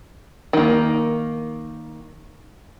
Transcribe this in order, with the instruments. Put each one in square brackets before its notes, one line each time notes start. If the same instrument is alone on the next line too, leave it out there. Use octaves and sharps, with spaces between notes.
[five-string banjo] D#3 A#3